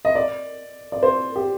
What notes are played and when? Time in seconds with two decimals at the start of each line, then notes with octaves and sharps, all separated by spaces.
0.05 D#5
0.15 D5
0.92 D5
1.03 C5
1.36 G4